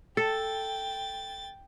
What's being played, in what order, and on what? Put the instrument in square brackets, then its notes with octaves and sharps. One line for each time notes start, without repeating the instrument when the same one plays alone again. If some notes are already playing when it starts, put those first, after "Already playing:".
[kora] A4 [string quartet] G5 A6